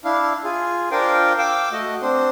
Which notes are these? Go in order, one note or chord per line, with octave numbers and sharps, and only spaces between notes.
D4 E4 F5
F4 G#4
D4 F4 A#4 C5 F5 G5
F5 G5 D6 E6
A3 F#4 D#5
C4 D4 C5